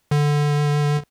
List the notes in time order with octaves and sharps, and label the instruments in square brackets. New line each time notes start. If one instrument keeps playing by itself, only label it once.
[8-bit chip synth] D3